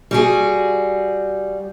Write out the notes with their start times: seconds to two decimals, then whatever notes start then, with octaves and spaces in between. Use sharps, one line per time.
0.11 G3 F#4 G#4